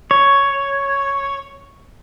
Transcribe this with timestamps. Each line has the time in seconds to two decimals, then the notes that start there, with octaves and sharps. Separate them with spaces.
0.11 C#5